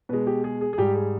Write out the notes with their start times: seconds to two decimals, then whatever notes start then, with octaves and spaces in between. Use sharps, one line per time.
0.09 B2 G#3 B4
0.27 G4
0.44 G#4
0.61 G#4
0.73 G#4
0.78 G#2 G3 G4
0.95 G#4